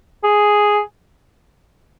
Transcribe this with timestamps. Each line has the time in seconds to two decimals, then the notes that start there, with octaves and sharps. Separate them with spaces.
0.24 G#4